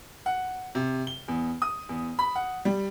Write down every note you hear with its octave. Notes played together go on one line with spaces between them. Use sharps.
F#5
C3
G7
E2
D#6
E2
B5
F#5
G3